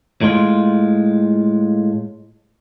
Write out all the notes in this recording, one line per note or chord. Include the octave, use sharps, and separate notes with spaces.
A2 G#3 F4